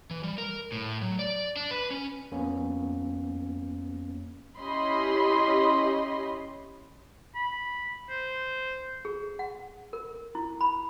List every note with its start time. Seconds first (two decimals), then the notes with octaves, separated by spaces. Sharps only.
0.11 E3
0.23 G3
0.38 A#4
0.72 A2
1.02 F#3
1.19 D5
1.57 D4
1.71 B4
1.91 C#4
2.32 F2 A#3 B3 C#4
4.60 C#4 E4 G4 D#5 B5 C6
7.35 B5
8.09 C5
9.05 G#4
9.39 F#5
9.93 A#4
10.35 E4
10.61 B5